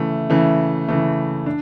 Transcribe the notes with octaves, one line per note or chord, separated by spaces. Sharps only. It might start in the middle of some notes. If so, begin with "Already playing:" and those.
Already playing: C#3 E3 A3
C#3 E3 A3
C#3 E3 A3
D4